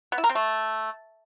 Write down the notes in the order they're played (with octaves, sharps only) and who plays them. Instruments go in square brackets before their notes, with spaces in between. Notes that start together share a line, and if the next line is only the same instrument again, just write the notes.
[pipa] B3
E4
A#4
C4
A3